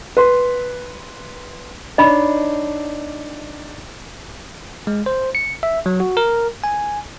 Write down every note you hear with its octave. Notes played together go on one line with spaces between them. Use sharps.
B4 C6
D4 D#4 C#5 D#5 B5
G#3
C5
C#7
E5
F#3
F#4
A#4
G#5